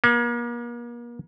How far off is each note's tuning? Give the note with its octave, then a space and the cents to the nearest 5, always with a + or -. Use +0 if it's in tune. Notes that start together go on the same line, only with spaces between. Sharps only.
A#3 +40